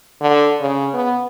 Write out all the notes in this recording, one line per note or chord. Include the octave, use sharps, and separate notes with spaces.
D3
C#3
B3